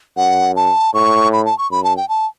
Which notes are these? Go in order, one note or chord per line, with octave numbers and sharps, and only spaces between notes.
F#2 F#5
A5
A2 C#6
B5
A5
C#6
F#2 B5
A5
G5
A5